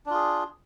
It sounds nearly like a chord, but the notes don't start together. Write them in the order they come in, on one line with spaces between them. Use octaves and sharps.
D4 F4 G#4